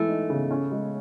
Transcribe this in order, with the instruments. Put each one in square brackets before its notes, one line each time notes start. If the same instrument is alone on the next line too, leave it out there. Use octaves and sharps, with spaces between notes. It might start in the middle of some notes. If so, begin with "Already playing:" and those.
Already playing: [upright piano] E3 G#3 [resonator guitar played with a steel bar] A3
[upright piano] D#4
C#3
C#4
G#3